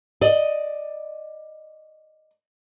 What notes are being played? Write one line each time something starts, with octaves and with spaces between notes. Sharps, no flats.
D5 D#5